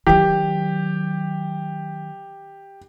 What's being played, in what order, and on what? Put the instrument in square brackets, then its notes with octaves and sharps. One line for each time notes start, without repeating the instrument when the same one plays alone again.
[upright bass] D#3 F#3 [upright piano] G4